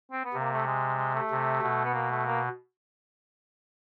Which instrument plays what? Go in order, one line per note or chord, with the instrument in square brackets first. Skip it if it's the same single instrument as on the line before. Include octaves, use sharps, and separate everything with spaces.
[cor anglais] C4
B3
[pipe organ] C3 [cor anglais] A#3
[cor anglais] A3
G#3
G#3
A3
[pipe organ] C3
B2
[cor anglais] B3
A#3
A3
A#3